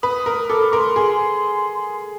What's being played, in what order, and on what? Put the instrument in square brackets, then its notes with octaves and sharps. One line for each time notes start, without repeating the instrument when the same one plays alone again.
[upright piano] B4 [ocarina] D#6
[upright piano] A#4
[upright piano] A4 [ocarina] D6
[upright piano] A#4 [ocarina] C6
[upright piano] G#4